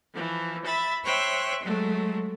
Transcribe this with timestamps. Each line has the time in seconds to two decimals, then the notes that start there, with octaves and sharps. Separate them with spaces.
0.14 E3 F3
0.64 E5 B5 A6
1.04 C5 C#5 E5 G5 F#6
1.63 F#3 G#3 A3